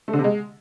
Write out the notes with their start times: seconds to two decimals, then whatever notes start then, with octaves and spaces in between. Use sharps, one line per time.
0.08 A3
0.13 D3
0.19 C3
0.24 G#3